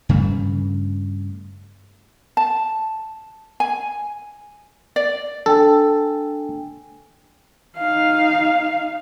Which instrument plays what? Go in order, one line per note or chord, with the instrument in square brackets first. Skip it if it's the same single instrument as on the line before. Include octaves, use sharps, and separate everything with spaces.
[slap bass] G2 C#3 G3 A3
[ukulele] A5
G#5
D5
[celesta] D4 G5 G#5 [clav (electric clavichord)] A4
[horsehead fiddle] D#4 F5